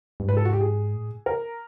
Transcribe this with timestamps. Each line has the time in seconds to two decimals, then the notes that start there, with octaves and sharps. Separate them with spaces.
0.20 G2
0.28 G#2 B4
0.37 A4
0.45 F#4
0.53 G4
0.61 G#4
0.94 A2
1.26 A#4